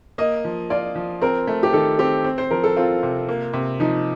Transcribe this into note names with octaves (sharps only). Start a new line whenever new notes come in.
A#3 D#5
F3
F4 D5
F3
C4 A#4
A3
G4
D#3 A4
C4 G4
C4
C5
F3 A#4
A4
C4 F4
C3
A#3
C3
F3 D#4